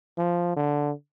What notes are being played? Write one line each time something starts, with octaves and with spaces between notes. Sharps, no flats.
F3
D3